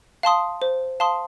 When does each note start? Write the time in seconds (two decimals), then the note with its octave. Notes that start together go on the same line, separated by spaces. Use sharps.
0.23 F5 A5 C6 D#6
0.62 C5
1.00 F5 A5 C6 D#6